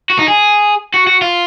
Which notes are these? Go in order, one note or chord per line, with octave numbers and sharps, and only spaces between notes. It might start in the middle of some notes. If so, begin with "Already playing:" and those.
F#4
D#4
G#4
F#4
F#4
F4